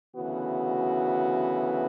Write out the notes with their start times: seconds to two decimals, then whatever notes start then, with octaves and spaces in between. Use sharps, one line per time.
0.16 D2 C#3 E3 B3 F#4